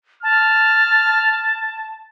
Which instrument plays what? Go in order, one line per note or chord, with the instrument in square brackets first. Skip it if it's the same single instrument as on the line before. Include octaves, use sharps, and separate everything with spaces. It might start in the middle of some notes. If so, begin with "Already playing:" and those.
[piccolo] A5 [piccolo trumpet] F6